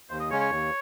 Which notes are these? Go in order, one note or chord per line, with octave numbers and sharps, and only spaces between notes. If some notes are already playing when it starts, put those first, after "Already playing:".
D#2 C5
D#5
C#3 G#3 C#4 C#5
C#5
D#2